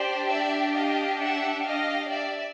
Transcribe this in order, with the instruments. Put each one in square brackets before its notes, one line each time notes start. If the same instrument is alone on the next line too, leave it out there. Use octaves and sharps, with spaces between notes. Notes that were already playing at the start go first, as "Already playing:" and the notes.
Already playing: [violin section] D4 G4 C5 D5
D5 E5
D#5 F5
E5 F#5
D#5 F5
D5 E5